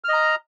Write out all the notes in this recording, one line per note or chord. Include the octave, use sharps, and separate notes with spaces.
D#5 A#5 F6